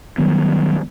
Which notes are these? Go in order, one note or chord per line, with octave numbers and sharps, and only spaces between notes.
D#3 F#3 G3 B3